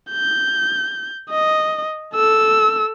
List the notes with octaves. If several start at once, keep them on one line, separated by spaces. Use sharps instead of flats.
G6
D#5
A4 E6